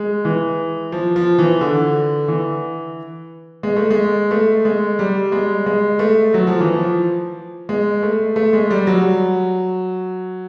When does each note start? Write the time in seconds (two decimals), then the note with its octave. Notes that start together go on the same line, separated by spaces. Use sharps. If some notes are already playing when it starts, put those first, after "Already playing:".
Already playing: G#3
0.25 E3
0.92 F3
1.16 F3
1.38 E3
1.61 D3
2.28 E3
3.63 G#3
3.76 A3
3.90 G#3
4.31 A3
4.65 G#3
4.99 G3
5.32 G#3
5.66 G#3
5.99 A3
6.34 F#3
6.47 F3
6.60 E3
6.74 F3
7.69 G#3
8.03 A3
8.36 A3
8.53 G#3
8.70 G3
8.87 F#3